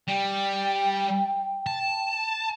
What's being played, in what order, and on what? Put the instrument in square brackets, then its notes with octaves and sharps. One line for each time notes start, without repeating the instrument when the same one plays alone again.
[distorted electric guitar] G3 [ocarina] G5
[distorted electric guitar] A5